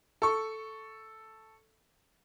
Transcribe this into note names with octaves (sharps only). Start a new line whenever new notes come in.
A4 C#6